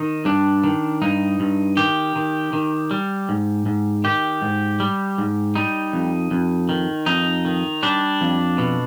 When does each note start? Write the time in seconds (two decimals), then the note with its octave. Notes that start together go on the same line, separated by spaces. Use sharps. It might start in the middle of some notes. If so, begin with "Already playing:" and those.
Already playing: D#3 D#4
0.25 G2 D4
0.64 D#3
1.02 G2 D#4
1.40 G2
1.77 D#3 G4
2.16 D#3
2.53 D#3
2.91 G3
3.29 G#2
3.66 G#2
4.04 D#3 G4
4.42 G#2
4.80 G3
5.18 G#2
5.55 G3 D#4
5.93 F2
6.31 F2
6.69 D#3
7.06 F2 D#4
7.45 D#3
7.83 G3 D4
8.21 F2
8.58 B2